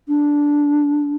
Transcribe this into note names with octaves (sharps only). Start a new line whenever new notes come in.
D4